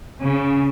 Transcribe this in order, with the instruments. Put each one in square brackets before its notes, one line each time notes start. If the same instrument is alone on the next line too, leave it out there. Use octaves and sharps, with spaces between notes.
[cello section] C#3